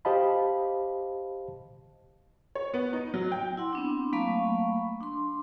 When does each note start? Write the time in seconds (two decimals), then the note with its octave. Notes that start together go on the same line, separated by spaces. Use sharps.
0.05 G4 C5 D#5 F5 A5 B5
2.55 C#5
2.74 B3
2.93 D#4
3.14 F#3
3.32 G5
3.57 E4 F#5 C6
3.73 B3 C4 D4
4.13 F#3 A3 A#3 F5 B5 C#6
5.01 D4 C6